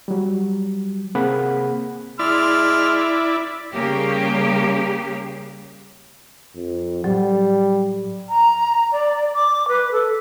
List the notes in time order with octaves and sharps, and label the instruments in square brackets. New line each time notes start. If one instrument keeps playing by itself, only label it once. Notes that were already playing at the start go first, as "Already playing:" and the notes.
[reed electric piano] F#3 G3
C3 A#3 C4 G#4 F#5 B5
[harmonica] G#3 C6 F6 [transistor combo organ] E4 D5
[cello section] C#3 G3 A#3 G4
[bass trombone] F2
[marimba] A2 F#3 [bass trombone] G3
[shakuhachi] A#5
D5
D6
B4
A4